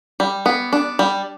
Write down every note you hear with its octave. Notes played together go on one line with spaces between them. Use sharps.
G3
B3
D4
G3